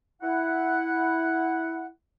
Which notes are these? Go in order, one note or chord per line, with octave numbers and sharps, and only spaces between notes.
E4 F#5